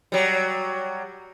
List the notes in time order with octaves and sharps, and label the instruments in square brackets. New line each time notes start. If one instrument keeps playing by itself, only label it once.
[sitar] F#3 G3